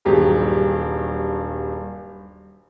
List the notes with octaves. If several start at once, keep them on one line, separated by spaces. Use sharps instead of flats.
D#1 G2 F#3 G4 G#4 A#5